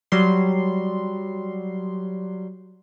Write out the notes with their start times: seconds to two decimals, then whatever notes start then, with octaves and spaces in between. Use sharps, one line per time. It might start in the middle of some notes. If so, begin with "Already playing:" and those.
0.12 F#3 G3 C6